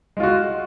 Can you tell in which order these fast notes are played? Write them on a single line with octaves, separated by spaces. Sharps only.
G#3 F4 F#4